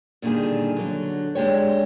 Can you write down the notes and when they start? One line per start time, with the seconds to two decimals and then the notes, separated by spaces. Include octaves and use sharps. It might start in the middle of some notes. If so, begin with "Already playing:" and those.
0.22 A#2 D3 D#3 G3 G#4
0.76 D3 F#3
1.35 G#3 D4 G4 C#5